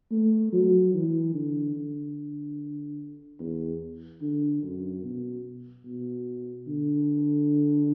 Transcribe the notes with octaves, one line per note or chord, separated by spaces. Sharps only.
A3
F#3
E3
D3
D3
E2
D3
F#2
B2
B2
D3